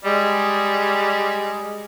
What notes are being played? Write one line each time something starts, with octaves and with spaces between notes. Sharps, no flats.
G3 G#3